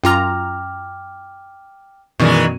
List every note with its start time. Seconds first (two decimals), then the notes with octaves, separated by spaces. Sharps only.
0.04 F#2 F4 G5 A#5 D6 F6
2.20 F#2 B2 D#3 E3 G#3 D5 C#6